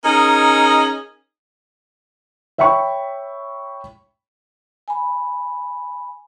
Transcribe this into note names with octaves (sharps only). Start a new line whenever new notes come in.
C#4 D#4 G#4 A#4
C#5 E5 G5 B5 C#6
G#5 B5